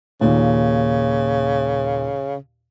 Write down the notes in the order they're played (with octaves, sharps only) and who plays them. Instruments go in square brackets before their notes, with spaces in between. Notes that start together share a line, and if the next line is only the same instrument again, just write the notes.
[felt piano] D#2 A#2 [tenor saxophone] C#3